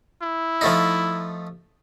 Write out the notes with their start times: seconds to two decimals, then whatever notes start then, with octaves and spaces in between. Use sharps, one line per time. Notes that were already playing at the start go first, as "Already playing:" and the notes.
0.22 E4
0.61 F3 A3 D#4